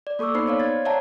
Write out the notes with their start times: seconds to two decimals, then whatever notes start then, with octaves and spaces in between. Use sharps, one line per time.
0.07 D5
0.19 A#3 A4 C#6 D6 E6
0.34 B3 D#4 C5 B5 C7
0.47 C#5 D5 F5
0.60 C5 G#6 A6
0.85 C#5 D5 E5 F#5 A5 A#5